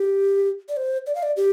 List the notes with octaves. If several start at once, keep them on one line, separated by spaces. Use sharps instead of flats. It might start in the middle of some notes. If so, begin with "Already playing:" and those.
Already playing: G4
D5
C5
D5
F5
D5
G4